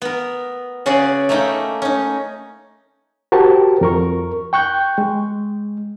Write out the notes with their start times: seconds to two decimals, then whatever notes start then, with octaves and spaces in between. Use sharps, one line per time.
0.02 B3 A#4
0.86 C#3 C#4 F#4 G#4 D5
1.29 A3 A#3 C#4 D#4 E5 G5
1.82 C#4 D#4
3.32 F#4 G4 A#4 C5 A5
3.81 F2 A#4 C#6
4.53 G5 C#6 F#6 G6
4.98 G#3